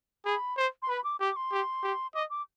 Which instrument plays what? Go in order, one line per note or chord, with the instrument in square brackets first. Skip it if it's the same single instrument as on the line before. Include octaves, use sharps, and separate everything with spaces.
[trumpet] G#4 [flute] B5
[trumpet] C5
[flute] C6
[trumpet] B4 [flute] B5
[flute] D6
[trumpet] G4 [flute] D6
[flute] C6
[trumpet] G4
G4
[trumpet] D#5 [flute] D6
[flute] D6